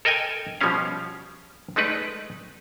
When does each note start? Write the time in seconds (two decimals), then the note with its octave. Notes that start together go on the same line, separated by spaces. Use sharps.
0.05 A4 A#4 D#5 G5 G#5
0.61 B2 F3 G3 B3 C#4 F5
1.76 G#3 A3 D#4 B4 D5